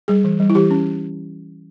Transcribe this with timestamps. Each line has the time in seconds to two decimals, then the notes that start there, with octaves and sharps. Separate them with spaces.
0.08 G3 G#4
0.24 E3
0.40 G3
0.50 E4
0.55 E3 G4
0.70 C#4